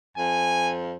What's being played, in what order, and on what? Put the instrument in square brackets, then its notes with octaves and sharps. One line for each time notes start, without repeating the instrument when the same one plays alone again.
[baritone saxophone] F2 [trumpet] G#5